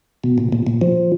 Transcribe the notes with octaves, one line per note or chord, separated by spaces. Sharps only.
B2
A#2
A#2
A#2
F3